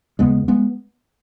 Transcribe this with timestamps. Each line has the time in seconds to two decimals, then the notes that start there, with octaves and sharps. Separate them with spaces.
0.19 D#2 C#3 G#3 B3
0.48 G#3 B3